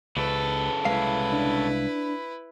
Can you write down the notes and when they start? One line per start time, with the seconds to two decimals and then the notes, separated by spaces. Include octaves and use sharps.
0.17 C#2 C#3 A4 B4
0.85 C2 G#3 E4 B4 F5
1.32 D4